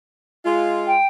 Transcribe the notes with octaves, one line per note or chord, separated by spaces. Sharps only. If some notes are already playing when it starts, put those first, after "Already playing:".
G#3 F4
G5